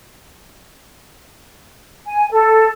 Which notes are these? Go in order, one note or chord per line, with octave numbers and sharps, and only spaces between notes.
G#5
A4